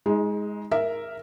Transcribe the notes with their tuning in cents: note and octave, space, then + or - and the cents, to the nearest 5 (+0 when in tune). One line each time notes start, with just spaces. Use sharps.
G#3 +0 D#4 +35
A#4 +0 E5 +0